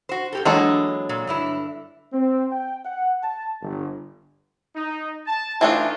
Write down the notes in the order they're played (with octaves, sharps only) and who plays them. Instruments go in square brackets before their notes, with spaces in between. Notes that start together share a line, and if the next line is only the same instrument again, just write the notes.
[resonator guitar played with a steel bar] F#4 C5
A2 G4 A4
[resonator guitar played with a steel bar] E3 A#3 D4 [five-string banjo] F#3 G#3 A4
[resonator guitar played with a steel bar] A#2
G2 D3 E4
[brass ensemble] C4
G5
F#5
A5
G1
[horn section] D#4
A5
[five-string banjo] E3 A3 D4 [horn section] D#4 F4